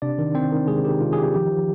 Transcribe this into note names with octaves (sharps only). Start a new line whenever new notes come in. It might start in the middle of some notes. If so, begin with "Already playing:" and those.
C3 D4 D5
D#3
D#3 C4 C5
D#3
C3 G#3 G#4
D#3 G4
C3 F4
G#4
D#3 G4
F3 G4
F3